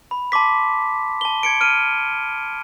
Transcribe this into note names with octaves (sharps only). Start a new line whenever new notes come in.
B5
A5 C6 D6 B6
A5 G7
G#6 C#7 D7
F6 D7 D#7